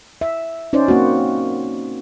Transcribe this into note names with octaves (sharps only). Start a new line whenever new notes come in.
E5
C#4 D#4 C5 D5
A#3 C4 F#4